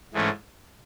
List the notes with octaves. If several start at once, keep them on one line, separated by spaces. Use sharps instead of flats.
G#2 E3 A3 C#4